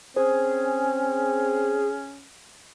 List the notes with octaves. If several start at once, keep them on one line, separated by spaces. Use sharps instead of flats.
C4 C#4 G#4 C5